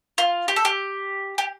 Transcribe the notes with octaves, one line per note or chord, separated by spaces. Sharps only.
F4
G4
A4
G4
G4